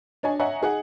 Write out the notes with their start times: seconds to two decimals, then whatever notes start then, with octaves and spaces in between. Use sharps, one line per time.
0.23 D4 C#5 D#5 G#5
0.39 C#5 D#5 E5 F#5 G#5 A#5
0.62 D#4 G#4 F#5